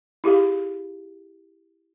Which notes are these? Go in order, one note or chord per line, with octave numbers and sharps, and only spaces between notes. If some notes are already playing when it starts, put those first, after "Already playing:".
E4 G4 G#4 F5